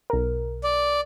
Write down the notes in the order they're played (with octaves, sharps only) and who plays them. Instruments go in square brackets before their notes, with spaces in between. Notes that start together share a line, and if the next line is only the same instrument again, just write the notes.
[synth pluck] B1 A#4
[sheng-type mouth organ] D5